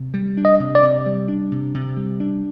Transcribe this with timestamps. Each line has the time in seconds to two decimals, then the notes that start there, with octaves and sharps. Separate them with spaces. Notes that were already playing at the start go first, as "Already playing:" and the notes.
Already playing: C3
0.14 G3
0.37 D4
0.45 D#5
0.60 C3
0.75 D5
0.83 C3
1.06 G3
1.28 D4
1.52 C3
1.74 C3
1.97 G3
2.20 D4